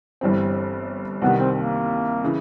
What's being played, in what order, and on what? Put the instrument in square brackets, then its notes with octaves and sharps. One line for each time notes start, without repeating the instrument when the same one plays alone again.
[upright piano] G1 G2 E3 G3 C4
[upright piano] C2 C3 D#3 G3 [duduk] B3
[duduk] C4
A#3
[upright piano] C#3 E3